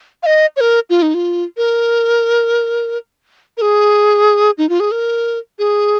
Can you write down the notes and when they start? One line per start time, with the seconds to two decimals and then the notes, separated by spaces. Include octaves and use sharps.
0.23 F5
0.26 D#5
0.56 C#5
0.61 A#4
0.90 F4
1.02 D#4
1.14 F4
1.57 A#4
3.57 A#4
3.62 G#4
4.58 D#4
4.69 F4
4.80 G#4
4.91 A#4
5.59 G#4